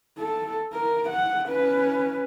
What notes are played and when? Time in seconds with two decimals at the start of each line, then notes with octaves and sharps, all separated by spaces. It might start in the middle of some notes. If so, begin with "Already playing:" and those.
0.19 A4
0.74 A#4
1.10 F#5
1.49 C#4 B4